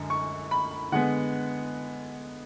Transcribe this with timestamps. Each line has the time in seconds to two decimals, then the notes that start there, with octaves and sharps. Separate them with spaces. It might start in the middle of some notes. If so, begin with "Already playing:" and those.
Already playing: F#2 D3 G#3
0.10 C#6
0.51 B5
0.92 D3 G#3 B3 F#5